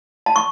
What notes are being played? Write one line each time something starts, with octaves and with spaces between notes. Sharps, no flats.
A5
C#6